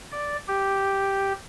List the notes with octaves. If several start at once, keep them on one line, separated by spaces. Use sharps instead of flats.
D5
G4